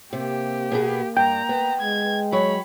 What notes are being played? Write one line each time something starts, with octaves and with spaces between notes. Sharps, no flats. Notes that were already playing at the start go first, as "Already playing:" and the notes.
C3 A#3 G4
B2 B3 G#4
G2 G5 A#5
B3
G#3 G#6
F#3 C#5 B5